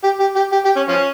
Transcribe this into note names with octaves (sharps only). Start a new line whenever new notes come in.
G4
G4
G4
G4
G4
C#4
F3 C#4